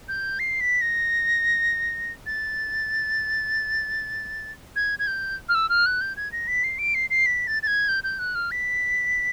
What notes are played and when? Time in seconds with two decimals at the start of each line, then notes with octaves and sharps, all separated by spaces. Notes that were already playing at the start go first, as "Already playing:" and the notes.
0.08 G6
0.39 C7
0.60 B6
0.81 A#6
2.26 A6
4.76 G#6
4.99 G#6
5.07 G6
5.49 F6
5.55 E6
5.69 F6
5.86 F#6
6.01 G6
6.16 G#6
6.32 A#6
6.48 B6
6.64 C7
6.79 D7
6.95 C7
7.10 C7
7.26 B6
7.47 A6
7.63 A6
7.67 G#6
7.88 G6
8.04 G6
8.19 F#6
8.35 F6
8.51 B6